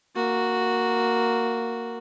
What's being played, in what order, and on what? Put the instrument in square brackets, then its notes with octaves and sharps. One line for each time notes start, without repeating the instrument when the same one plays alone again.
[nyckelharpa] A#3 F#4